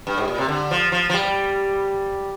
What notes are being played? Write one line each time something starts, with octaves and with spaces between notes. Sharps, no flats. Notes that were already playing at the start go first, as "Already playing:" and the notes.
G2
G#2
A#2
C3
D3
F3
F3
F3
G3